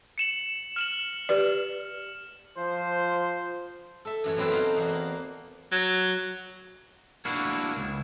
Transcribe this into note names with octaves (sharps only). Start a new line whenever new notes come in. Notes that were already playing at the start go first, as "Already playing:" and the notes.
C#7 E7 F#7
F6 E7 F#7
G4 B4 D5
F3 C5
A4 E5
F#2 E3 C#5
B2 F#3 C4 E4 A4 B4
D#4 F#4 C5 F5 A5
E2 F#4
A#3
F#3
A#3 D4 E4 F#4
C#2